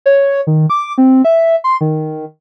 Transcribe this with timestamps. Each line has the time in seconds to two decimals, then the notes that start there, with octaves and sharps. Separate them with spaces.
0.06 C#5
0.47 D#3
0.70 D6
0.98 C4
1.25 E5
1.64 C6
1.81 D#3